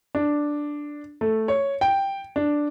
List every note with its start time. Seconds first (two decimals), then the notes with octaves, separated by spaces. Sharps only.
0.15 D4
1.21 A3
1.48 C#5
1.81 G5
2.36 D4